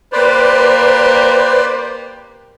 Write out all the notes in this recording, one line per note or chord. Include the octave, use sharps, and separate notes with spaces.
A#3 G4 B4 C5 D5